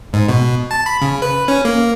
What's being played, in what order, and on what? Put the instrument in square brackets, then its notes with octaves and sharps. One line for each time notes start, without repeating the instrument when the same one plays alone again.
[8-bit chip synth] G#2
B2
A5
B5
C#3
B4
C#4
A#3